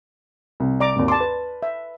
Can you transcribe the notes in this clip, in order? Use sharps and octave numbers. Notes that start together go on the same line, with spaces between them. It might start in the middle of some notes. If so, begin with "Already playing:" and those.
C2
D5 A#5 D6
G#1 D#2
A5 C6 D6
B4
E5